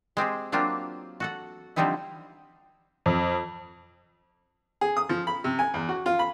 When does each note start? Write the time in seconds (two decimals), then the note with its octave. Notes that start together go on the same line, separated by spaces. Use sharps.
0.17 G#3 C4 G4 G#4
0.52 F#3 A#3 C4 D4 F4 G4
1.20 F#4 A4 F#5
1.76 D3 F3 G3 C4 D#4 E4
3.06 F2
4.81 G#4
4.97 D#6
5.09 F3
5.27 B5
5.44 C3
5.59 G#5
5.74 E2
5.89 F#4
6.06 F4
6.19 B5